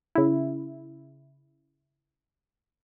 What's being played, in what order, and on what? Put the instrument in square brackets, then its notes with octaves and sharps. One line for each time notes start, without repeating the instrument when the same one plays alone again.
[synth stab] C#3 E4